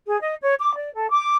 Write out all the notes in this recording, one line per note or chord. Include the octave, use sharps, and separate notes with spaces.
G#4
D#5
C#5
D6
D5
A4
D6